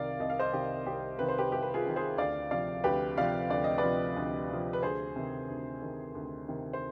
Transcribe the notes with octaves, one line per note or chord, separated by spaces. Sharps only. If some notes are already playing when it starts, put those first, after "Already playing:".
Already playing: C2 C3 D#3 D5 F5
C2 D#5
F5
C5 D#5
C3 D#3 G4
C2 G4
C3 D#3 B4
C5
G4 B4
C2 G4
B4
F4 G#4
C3 D#3
G#4 C5
D2 D5 F5
C3 F3 D5 F5
D2 G4 B4
C3 F3 D5 F5
D2 D5
D#5
B4 D5
C3 F3
D2
C3 F3
B4
D2 G#4 C5
C3 D#3
D2
C3 D#3
D2
C3 D#3
C5